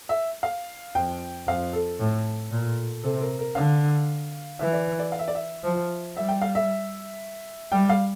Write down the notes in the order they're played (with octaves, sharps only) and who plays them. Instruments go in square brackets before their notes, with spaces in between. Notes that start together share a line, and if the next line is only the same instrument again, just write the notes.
[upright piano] E5
F5
[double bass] F2 [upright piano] G5
[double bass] F2 [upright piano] F5
[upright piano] A4
[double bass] A2
A#2
[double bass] C3 [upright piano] A4
[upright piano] A#4
A#4
[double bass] D3 [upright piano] F5
[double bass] E3 [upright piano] E5
[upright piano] D5
D5
F5
E5
D5
E5
[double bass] F3
[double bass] G3 [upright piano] E5
[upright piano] G5
F5
E5
[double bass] G3 [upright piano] G5
[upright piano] F5